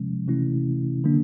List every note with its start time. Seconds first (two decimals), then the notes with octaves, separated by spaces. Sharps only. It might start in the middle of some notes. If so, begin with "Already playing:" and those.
Already playing: C3 F3 G#3 C#4
0.28 C3 E3 A3 C#4 E4
1.04 D3 F#3 A#3 D4